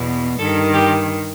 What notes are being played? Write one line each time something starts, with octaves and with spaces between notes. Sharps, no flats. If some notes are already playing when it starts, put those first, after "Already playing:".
Already playing: E2 B2
G2 D#3 A4
G4